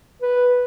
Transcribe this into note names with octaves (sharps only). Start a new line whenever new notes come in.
B4